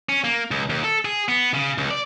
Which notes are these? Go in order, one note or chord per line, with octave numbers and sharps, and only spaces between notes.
C#4
A#3
C#2
D#2
A4
G#4
B3
C#3
C#2
D5